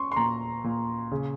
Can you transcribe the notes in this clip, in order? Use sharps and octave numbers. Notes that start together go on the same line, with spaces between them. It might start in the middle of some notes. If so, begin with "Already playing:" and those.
Already playing: C#4 C6 C#6
C6
A#2 A#5
A#2
C#3